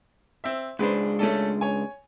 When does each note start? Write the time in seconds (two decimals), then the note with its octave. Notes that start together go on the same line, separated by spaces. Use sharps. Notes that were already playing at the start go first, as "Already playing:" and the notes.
0.44 C4 E5
0.79 C#2 G#3 D4 B4 C5
1.19 A3 C#4 A4
1.61 C#5 G#5